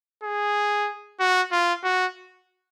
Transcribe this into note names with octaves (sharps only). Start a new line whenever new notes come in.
G#4
F#4
F4
F#4